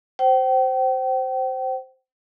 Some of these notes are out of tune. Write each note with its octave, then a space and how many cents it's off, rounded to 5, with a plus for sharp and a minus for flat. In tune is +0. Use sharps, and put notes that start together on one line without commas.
C5 +0 G5 -35